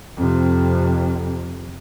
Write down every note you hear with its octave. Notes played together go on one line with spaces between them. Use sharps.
F2 C3